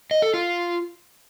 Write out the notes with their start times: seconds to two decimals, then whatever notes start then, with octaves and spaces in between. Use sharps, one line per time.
0.11 D#5
0.22 A4
0.34 F4